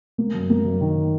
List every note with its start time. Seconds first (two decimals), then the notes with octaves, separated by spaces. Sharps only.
0.18 A#3
0.34 F#2
0.50 A#3
0.65 F#2
0.81 D#3